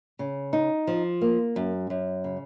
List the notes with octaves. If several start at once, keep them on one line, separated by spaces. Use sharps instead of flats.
C#3
D#4
F3
A#3
F#2
F#2
C#3